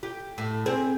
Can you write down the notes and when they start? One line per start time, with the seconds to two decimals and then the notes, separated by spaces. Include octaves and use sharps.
0.03 G4
0.38 A2
0.66 C4 G#4